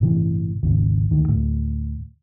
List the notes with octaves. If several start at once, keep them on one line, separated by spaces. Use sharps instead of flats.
G1 A2 C3 E3
G#1 D#2 C#3
D2 D#3
D2 A2